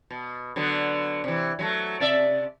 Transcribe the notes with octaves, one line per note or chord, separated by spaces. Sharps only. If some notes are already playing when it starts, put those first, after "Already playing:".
B2
D3 F#3 B3
C3 E3
F#3 G3 A3
C3 D5 E5